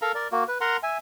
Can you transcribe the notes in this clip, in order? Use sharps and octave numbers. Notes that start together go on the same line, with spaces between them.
A4 A#4 F5 A#5
A#4 D5
A#3 F#4
B4
A#4 F#5 A#5 C6
E5 G#5